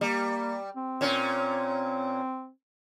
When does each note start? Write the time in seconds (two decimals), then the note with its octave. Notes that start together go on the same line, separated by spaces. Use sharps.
0.01 G3 A#3
0.76 C4
1.01 A#2 C#4